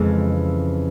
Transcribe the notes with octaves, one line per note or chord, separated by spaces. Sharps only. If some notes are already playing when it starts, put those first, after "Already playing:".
Already playing: F2 C#3 E3 G#3